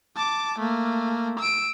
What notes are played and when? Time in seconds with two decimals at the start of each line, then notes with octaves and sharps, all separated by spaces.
0.16 A5 D6
0.58 A3 A#3
1.39 E6 D7